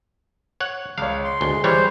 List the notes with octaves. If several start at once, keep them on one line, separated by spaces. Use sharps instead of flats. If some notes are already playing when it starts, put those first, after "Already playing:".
C#5 F#5
C#2 C#5 F5
C6
D2 G#3 G7
E3 G3 C5 C#5